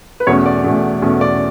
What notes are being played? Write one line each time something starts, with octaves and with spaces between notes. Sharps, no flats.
B4
E2 B2 A3 C#4 C#5
D5
E2 B2 A3 C#4
E2 B2 A3 C#4
D5